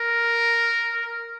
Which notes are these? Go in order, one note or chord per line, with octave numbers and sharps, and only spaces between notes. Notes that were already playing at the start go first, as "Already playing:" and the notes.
Already playing: A#4